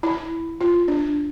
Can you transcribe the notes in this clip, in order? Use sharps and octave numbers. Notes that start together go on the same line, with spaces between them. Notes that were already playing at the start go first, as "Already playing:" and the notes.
E4
F4
D4